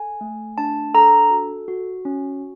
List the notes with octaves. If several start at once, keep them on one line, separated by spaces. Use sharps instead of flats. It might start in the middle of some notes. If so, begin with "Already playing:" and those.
Already playing: A4 G#5
A3
D4 A5
A4 A#5
F#4
F#4
C#4